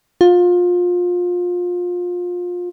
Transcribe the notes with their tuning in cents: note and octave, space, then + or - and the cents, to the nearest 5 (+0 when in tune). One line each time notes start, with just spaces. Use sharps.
F4 +25